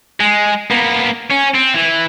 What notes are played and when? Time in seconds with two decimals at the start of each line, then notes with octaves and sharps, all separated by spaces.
0.20 G#3
0.71 A#3 B3
1.30 C#4
1.54 C4
1.74 E3